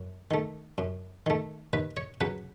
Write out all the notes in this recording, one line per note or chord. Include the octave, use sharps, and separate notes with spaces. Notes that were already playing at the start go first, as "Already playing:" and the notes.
Already playing: F#2
D#3 A3
F#2
D#3 A3
D#2 B4
C#5
C#3 F#3 B4